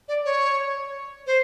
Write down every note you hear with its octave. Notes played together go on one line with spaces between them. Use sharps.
D5
C#5
C5